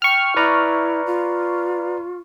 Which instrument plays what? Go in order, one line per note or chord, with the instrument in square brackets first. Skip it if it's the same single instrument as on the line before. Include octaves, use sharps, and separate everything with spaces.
[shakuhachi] G5 [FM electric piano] C#6 F6
[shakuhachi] E4 [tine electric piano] B4 D5 A#5
[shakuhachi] F4